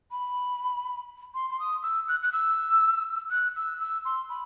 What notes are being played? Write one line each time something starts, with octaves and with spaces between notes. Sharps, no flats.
B5
C6
C6
D#6
E6
F#6
F#6
E6
F#6
E6
E6
C6
B5